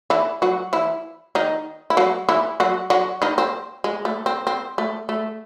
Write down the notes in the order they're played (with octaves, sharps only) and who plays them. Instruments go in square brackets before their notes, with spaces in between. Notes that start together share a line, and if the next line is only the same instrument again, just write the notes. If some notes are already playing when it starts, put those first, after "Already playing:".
[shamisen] E3 E4
F#3 F#4
E3 E4
D#3 D#4
E4
F#3 F#4
E3 E4
F#3 F#4
F#3 F#4
D#3 D#4
C4
G#3
A3
C4
C4
A3
A3